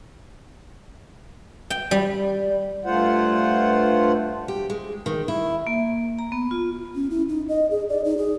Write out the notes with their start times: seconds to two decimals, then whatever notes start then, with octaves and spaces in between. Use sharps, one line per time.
1.70 G5
1.91 G3
2.85 G2 A3 F4 C5 F#5
4.48 G4
4.70 G#3
5.06 D#3
5.28 E4
5.67 A#3
6.19 A#5
6.32 B3
6.51 F4
6.95 C#4
7.10 E4
7.29 D#4
7.49 D#5
7.70 G#4
7.89 D5
8.04 D#4
8.17 G#4